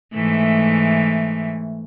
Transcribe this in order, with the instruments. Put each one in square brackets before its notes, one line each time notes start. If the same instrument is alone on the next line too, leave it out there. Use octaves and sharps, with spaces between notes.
[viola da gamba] G#2 E3 A3